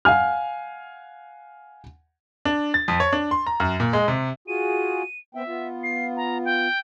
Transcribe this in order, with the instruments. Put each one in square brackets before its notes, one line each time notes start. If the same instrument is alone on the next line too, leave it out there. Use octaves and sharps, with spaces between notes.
[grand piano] F5 F#5 G#5 F6
D4
A6
F2
C#5
D4
C6
A#5
F#2
A#2
G#3
C3
[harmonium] F4 F#4 G#4 [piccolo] D#7
[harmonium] B3 C4 G5 [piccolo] E5
[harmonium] B3 F4
[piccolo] C7
A#5
G5